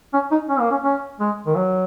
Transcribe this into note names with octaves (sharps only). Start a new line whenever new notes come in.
C#4
D#4
C#4
A#3
C#4
C#4
G#3
D#3
F#3